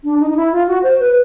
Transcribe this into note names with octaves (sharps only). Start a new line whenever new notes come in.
D4
D#4
D#4
E4
F4
F#4
C5
B4